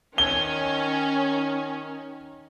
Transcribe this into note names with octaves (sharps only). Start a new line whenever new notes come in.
D#3 C#4 G7